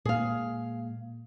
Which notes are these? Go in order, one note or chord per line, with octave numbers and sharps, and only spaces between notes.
A#2 G#3 A#3 G#4 F5